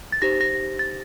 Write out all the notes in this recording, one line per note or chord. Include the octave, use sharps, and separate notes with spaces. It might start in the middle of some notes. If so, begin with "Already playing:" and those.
A6
D#4 G4 C5 A#6
A#6
A6